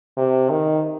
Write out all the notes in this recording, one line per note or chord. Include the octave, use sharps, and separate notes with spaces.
C3
D#3